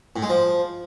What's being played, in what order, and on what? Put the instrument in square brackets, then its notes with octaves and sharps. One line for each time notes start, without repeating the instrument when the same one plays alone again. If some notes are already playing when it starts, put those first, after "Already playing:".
[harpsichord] A2
G#3
F3